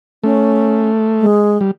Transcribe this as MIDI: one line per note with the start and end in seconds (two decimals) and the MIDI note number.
0.24 1.26 57
0.24 0.90 61
1.20 1.57 56
1.61 1.71 55